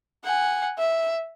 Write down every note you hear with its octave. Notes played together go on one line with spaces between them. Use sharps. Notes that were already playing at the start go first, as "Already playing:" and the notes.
F#5 G#5
E5